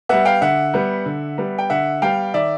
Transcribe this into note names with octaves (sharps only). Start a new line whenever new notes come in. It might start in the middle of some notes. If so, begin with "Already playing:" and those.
G3 B3 E5 F#5
F5 G5
D3 E5 F#5
G3 B3
D3
G3 B3
G5
D3 E5 F#5
G3 B3 F5 G5
D#3 D5 E5